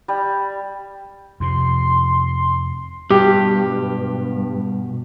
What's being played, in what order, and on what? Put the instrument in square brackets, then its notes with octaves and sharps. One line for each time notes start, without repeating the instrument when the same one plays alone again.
[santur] G3
[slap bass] F2 C3 [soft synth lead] C6
[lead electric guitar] G2 [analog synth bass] B2 [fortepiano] G4